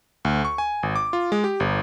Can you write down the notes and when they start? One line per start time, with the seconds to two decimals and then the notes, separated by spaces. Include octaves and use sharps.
0.25 D2
0.45 C#6
0.58 G#5
0.83 G#1
0.96 D6
1.13 F4
1.32 G#3
1.44 G4
1.60 G1